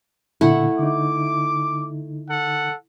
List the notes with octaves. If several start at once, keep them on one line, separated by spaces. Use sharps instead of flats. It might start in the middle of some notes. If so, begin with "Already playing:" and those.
A#2 D3 A3 E4 F#5
D3 D#4 D6
A4 F#5